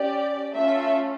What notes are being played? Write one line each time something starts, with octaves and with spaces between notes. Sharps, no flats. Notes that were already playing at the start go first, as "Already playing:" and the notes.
Already playing: C#4 G4 D5
A3 C#4 F4 A4 E5